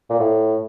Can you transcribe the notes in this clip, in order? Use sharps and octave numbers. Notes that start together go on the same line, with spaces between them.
A#2
A2